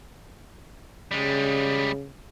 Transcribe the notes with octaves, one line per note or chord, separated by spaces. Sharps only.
C#3 G3 G#3